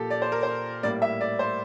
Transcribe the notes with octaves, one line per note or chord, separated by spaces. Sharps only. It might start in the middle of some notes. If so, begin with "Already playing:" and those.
Already playing: A#2 F3 A#3 G4 A4
D5
C5
A#4
C5
A2 G3 A#3 D5
E5
D5
C5